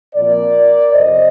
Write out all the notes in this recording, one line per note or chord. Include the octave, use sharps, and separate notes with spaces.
A#2 F3 C4 A#4 D5
F2 C3 F3 C4 C5 D#5